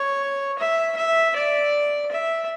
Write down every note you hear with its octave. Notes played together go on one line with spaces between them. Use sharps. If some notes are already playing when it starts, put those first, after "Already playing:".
Already playing: C#5
E5
E5
D5
E5